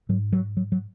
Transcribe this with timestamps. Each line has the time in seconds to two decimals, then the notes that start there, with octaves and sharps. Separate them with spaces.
0.09 G#2 F#3
0.33 F#3
0.57 F#3
0.72 F#3